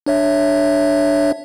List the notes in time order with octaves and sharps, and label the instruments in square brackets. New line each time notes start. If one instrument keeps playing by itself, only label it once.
[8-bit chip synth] D4 C#5 E5